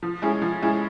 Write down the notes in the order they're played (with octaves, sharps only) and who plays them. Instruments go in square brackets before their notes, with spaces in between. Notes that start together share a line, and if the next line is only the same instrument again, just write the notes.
[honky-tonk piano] F3
G#3 C#4 E4 G#4
F3
G#3 C#4 E4 G#4